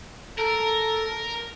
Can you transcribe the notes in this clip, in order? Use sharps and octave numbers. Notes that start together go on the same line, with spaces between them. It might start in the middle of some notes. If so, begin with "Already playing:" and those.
A4 A#4